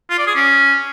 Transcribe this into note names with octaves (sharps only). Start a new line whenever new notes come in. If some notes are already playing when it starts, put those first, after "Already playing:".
F4
D5
G#4
C#4